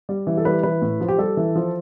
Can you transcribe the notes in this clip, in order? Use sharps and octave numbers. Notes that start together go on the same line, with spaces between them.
G3
E3
A4
G3 B4
E3 B4
A2
F3
G4
G3 A4
E3
F3